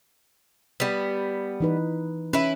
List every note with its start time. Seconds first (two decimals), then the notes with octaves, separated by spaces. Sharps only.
0.80 G3 B3
1.60 E3 D#4 B4
2.33 C#4 E4 B4